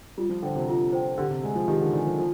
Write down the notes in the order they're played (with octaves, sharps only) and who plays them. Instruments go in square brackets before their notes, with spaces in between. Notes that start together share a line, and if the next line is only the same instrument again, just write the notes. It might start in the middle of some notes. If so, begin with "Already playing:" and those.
[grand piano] G3 [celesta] F4
[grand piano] F3
[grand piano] D3 [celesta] C5 G5
[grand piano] C3
[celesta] F4
C5 G5
[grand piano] D3 [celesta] G4
[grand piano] C3
[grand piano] G#3 [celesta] D5 G#5
[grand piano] F3
[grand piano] D#3 [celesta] G4
[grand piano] D3
[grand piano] D#3 [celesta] D5
[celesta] G#5
[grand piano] F3
[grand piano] F3 [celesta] F4